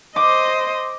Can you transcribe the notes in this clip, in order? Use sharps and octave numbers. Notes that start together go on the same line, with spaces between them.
C5 D#5 D6